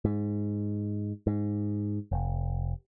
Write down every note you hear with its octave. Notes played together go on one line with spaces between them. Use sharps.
G#2
G#2
F1